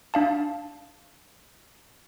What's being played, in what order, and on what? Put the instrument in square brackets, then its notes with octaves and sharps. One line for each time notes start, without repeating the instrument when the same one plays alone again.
[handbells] D4 F5 A5